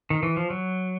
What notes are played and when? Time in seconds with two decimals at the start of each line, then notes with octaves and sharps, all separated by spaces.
0.10 D#3
0.23 E3
0.37 F3
0.50 F#3